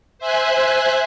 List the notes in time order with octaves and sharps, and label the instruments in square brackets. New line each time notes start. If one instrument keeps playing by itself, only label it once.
[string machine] C5 E5 G#5 F#6